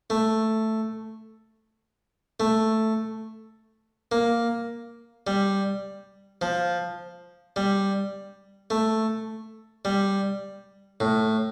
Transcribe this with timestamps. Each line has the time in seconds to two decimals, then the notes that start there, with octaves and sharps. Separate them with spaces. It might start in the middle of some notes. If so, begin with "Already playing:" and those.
0.10 A3
2.40 A3
4.12 A#3
5.27 G3
6.41 F3
7.56 G3
8.70 A3
9.85 G3
11.00 A2